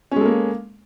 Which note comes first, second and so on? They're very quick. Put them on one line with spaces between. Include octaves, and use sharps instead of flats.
C#4 G#3 A4 A#3